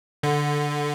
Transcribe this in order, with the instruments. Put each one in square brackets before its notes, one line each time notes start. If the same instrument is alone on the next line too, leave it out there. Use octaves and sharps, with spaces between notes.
[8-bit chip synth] D3